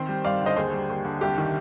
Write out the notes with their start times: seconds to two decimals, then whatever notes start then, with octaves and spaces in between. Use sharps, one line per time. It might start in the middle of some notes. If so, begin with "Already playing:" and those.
Already playing: D#3 C4 C5
0.09 G3
0.24 G2 D5 F5
0.41 D3 C5 D#5
0.56 D#2 G#4 C5
0.73 G3
0.89 D#2
1.05 D3
1.21 C2 G4
1.38 D#3